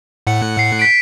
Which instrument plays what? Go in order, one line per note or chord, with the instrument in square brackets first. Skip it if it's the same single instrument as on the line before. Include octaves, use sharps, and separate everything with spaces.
[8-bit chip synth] A2 F#5 C#7
[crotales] C7
B6 D7